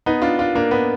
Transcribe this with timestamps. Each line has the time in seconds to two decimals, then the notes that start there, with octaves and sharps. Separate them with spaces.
0.06 B3 D#4
0.22 D4 F4
0.39 D4 F4
0.55 A#3 D4
0.71 B3